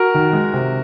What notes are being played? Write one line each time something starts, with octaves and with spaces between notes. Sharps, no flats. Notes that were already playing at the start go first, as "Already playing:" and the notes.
Already playing: F#4 A#4
D#3
G#3
C3